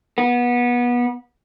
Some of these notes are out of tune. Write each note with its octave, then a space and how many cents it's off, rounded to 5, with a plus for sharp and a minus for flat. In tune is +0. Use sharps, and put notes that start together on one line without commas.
B3 -25